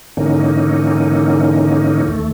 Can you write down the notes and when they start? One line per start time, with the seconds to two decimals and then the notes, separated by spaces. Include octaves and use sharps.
0.17 G#2 D3 E3 A#3 C#4 D#4
2.08 D#2 A3